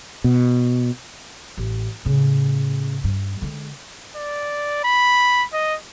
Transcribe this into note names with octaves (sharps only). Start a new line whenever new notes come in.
B2
A1
A2 C#3
G2
D3 G#3
D5
B5
D#5